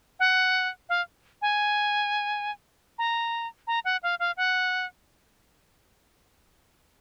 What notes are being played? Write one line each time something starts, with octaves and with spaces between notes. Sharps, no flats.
F#5
F5
G#5
A#5
A#5
F#5
F5
F5
F#5